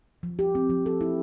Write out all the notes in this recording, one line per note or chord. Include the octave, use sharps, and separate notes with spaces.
F3
G4
C4
F3
A4
E4